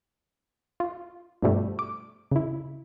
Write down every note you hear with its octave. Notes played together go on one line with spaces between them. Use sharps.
F4
G2 B2 F3 G3 A3
D6
C#3 E4